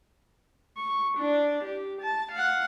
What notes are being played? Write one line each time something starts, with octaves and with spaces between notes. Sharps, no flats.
C#6
D4
G4
A5
F5 F#5